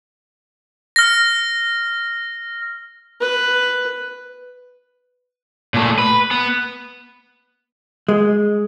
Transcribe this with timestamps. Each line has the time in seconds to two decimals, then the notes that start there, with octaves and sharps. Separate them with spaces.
0.96 F6 A#6
3.21 B4
5.74 A#2 A3
5.99 B4
6.31 B3
8.09 G#3